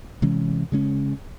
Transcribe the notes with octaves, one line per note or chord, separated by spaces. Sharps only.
C3 E3 G#3 C#4
C#3 G#3 C#4